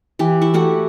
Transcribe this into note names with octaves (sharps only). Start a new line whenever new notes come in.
E3 G4
E4 C#6
A3 F#4 G4 F#5